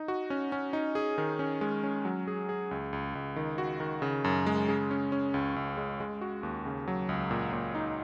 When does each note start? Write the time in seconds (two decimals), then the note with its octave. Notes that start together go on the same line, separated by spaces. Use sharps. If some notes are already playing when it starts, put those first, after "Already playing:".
Already playing: D#4
0.08 F#4
0.30 C#4
0.52 C#4
0.73 D#4
0.95 G#4
1.18 D#3
1.39 C#4
1.61 G#3
1.83 C#4
2.05 F#3
2.28 G#4
2.49 G#4
2.71 C#2
2.93 C#2
3.15 C#2
3.36 D#3
3.58 F#4
3.80 D#3
4.02 C#3
4.24 F#2
4.46 G#3
4.68 C#3
4.91 C#4
5.12 C#4
5.34 C#2
5.56 C#2
5.77 G#3
6.00 G#3
6.21 F#4
6.43 D#2
6.66 C#3
6.88 F#3
7.09 C#2
7.31 A#2
7.53 A#2
7.75 D#4